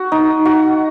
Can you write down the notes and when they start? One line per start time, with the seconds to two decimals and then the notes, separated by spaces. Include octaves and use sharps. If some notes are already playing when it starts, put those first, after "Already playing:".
Already playing: F#4
0.12 D#4
0.45 F#4